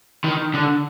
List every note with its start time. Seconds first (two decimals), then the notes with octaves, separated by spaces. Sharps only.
0.24 D#3
0.54 D3